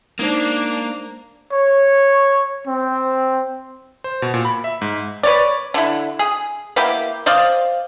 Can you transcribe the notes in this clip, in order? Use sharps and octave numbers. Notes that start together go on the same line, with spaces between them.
G#3 A#3 D4 D#4 C5
C#5
C4
C5
B2
A#2
B5
E5
G#2
B4 C#5 D5
D3 E4
G#4
A#3 B3 E4 G4
C5 D5 D#5 F5